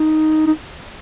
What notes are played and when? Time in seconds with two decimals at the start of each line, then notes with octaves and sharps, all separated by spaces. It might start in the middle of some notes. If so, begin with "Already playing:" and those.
Already playing: D#4
0.47 D#4